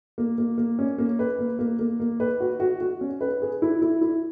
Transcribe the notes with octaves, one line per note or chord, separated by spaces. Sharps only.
A#3
A#3
A#3
C#4
A#3
B4
A#3
A#3
A#3
A#3
B4
F#4
F#4
F#4
C#4
B4
G#4
E4
E4
E4